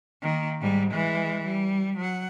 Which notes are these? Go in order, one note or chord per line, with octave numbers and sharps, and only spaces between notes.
D#3 A#3
G#2 G3
E3 G#3
G3
F#3 F#5